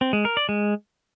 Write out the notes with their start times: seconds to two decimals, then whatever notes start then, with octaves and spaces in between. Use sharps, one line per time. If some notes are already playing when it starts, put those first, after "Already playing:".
0.01 C4
0.13 G#3
0.25 A#4
0.37 D5
0.49 G#3